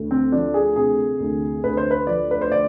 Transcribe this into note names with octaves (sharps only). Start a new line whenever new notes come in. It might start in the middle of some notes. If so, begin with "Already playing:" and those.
Already playing: D2
C4
F3 D4
G#4
C3 G#4
D2
D2 B4
C5
B4
F3 D5
B4
C5
D3 D5